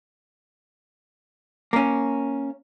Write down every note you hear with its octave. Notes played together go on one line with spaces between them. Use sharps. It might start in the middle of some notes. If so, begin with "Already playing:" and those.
A#3 C#4